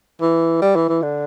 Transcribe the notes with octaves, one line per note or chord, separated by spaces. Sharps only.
E3
G3
E3
E3
D3